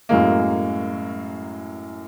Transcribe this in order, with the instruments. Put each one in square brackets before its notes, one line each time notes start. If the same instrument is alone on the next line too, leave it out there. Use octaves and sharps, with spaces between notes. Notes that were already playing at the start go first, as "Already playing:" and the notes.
[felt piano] F#2 A2 F#3 G#3 A#3